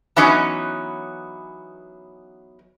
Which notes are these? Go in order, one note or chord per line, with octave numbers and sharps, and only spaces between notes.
E3 F#3 B3 C#4 D#4 B4